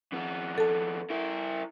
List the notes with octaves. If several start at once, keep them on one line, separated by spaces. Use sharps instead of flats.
F2 B3
A4 A5
E4 A#4